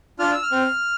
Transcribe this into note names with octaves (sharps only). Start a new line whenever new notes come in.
D4 F4 F6
E6
F6
C4